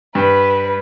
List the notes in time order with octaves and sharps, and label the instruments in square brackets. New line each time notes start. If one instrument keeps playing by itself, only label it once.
[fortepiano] G2 [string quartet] B4